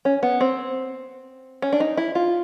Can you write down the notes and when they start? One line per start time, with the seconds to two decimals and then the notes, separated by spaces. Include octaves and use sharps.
0.05 C#4
0.23 B3
0.41 C4
1.62 C#4
1.73 D4
1.80 D#4
1.97 E4
2.15 F4